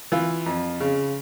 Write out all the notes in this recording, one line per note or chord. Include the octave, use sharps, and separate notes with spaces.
E3 F4
F2
C#3